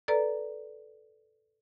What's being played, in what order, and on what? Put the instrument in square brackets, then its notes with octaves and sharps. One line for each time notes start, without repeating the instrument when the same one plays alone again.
[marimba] A4 B4 D5 A#5